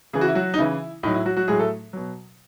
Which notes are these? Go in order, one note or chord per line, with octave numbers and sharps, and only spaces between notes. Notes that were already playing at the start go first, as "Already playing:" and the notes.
C#3 E3 G#4
F#4
E4
F#3 F#4
D#4
C#3 E3 E4
A2 F#3 D#4
E4
F#3 F#4
F#3 F#4
A2 F#3 G#3 G#4
A3 A4
B2 F#3